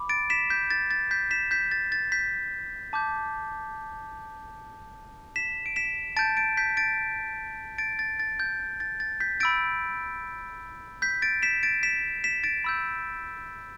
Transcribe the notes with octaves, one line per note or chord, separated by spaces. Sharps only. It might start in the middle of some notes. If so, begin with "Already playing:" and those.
Already playing: B5 D6
A6 D7
B6 E7
G6 B6
A6
A6
G6 B6
B6 E7
G6 B6
A6
A6
G6 B6
A5 D6 G6
B6 E7
D7
B6 E7
A5 G6 A6 D7
A6 D7
G6 B6
A6 D7
A6 D7
A6
A6
G6
A6
A6
G6 B6
B5 E6 G6 A6 D7
G6 B6
A6 D7
B6 E7
A6 D7
B6 E7
B6 E7
A6 D7
B5 E6 G6